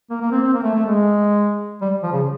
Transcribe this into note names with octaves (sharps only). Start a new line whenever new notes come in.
A#3
A#3
C4
C4
A#3
A3
A3
G#3
G3
F3
C#3